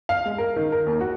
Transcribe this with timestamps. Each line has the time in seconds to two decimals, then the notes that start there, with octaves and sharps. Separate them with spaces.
0.09 F5
0.26 G#3
0.38 A#4
0.56 D#3
0.72 A#4
0.86 D#2
1.01 F#4